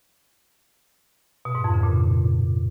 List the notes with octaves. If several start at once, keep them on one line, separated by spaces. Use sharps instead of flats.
B2
G#2
F2
C#3
A#2